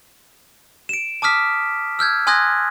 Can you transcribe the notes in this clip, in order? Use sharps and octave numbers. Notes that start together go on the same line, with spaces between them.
D7 E7
A5 D6 D#6 F6 B6
E6 F6 G6 G#6
G#5 C6 D#6 F#6 G#6 A#6